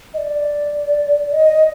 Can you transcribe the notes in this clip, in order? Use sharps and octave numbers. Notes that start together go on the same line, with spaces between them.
D#5
D5
D#5